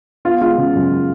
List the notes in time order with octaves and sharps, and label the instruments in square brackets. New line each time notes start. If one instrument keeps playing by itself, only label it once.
[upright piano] B3 F4
G#3 F4
C#3
F#2